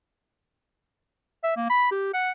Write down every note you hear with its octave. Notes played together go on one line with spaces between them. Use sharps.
E5
A#3
B5
G4
F#5